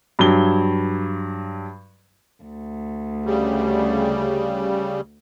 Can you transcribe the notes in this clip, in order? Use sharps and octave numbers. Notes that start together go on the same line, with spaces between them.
G2 F#3 G7
D2
C#3 G3